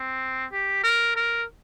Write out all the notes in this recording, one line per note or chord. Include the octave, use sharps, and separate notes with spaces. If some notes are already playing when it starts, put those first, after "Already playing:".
Already playing: C4
G4
A#4
A#4